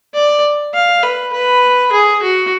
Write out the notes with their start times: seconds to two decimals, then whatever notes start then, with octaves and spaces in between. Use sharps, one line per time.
0.14 D5
0.74 F5
1.03 B4
1.33 B4
1.92 G#4
2.22 F#4